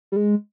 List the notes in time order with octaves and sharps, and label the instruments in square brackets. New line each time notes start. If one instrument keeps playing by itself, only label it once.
[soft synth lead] G3
G#3